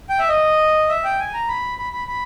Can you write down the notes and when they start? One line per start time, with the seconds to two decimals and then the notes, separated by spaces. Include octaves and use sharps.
0.10 G5
0.19 E5
0.29 D#5
0.89 E5
1.04 G5
1.19 G#5
1.34 A#5
1.48 B5
1.78 B5
1.93 B5
2.08 B5